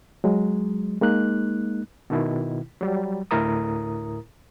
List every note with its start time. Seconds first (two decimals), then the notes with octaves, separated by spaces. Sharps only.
0.24 F#3 G#3
1.01 G#3 A#3 D#4 F#6
2.10 B2 D#3 E4
2.81 F#3 G3
3.31 D2 A2 E4 A#4 A#5 D#6